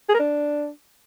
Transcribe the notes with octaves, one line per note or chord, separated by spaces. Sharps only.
G#4
A#4
D4